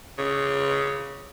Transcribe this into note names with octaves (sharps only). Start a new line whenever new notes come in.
C#3